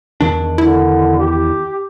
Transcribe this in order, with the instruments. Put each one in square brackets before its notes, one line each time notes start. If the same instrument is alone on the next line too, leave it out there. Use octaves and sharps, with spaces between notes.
[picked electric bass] E2 D#3 D4
[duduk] D3 [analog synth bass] E4
[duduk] G4